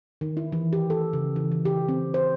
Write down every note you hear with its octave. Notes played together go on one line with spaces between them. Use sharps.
D#3
E4
E3
G4
A4
C#3
E3
E3
G4
C4
C5